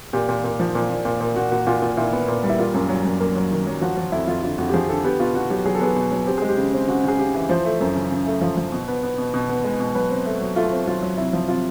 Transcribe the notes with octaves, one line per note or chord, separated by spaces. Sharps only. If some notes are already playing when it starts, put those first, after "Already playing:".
A#2 G4
A#2
A#2
F3
A#2
A#2
A#2
A#2
A#2 F#4
A#2 F#4
A#2 F4
A#2 F4
A#2 E4
B3
A#2
G3
E4
A#3 F4
F#2
F#3
F#2
A#3
F#3
D#3
F#3
F3 F#4
F3 F4
F2 E4
F2 F4
D3 F4
F2 F#4
G4
F3 G#4
D3 A4
B3 G4
B2 F4
B2 F#4
F#3 G4
F#3 G#4
A4
B3 G#4
B2
F#3
C4 G4
G#3 G#4
G4
C#3
C4
C#3 F#4
C#3 G#4
C#3 G4
E3
F3 C5
A3
F#2
C#3
C#3
A3
F3
F3
B2
B3
B3
B2
B2
B3
G#3
B2
F#3 B4
C4
A3
F#3
A3 F4
C4
F#3 F4
F#3
C3 E4
F3
C3 F4